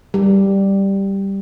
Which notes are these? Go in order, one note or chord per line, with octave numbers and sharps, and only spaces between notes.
G3